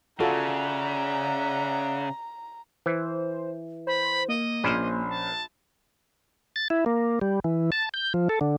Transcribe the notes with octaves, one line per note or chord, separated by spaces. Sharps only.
C#3 F4 F#4 A4 D5 E5 F#5 A#5
E3 C5
C5 B5
A#3 D#5
A#1 C#4 C5 D5 F6
A5
A6
E4
A#3
G3
E3
A5
G6
F3
A4
D3